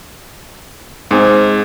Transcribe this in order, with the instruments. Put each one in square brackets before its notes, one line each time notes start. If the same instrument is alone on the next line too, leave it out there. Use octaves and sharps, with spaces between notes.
[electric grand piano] G#2 [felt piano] C4 G#4